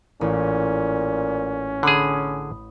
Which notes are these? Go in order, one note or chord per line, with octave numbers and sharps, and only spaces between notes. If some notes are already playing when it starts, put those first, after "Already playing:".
A1 A#2 C#4
D3 G#4 B5 D#6